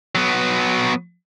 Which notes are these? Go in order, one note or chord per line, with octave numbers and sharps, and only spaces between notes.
F#3 B3